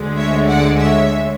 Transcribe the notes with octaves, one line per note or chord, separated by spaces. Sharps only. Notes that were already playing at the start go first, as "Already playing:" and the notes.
Already playing: D2 D3 G#3
C#5 E5
D5 F#5
C#5 E5